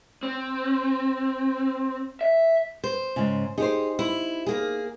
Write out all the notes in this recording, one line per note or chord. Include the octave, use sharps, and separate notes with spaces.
C4
E5
C5
G#2 C#3
D#4 G4 G#4 C5
E4
A#3 G#4